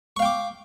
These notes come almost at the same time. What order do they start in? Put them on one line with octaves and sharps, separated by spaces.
C#6 F5 G5 D6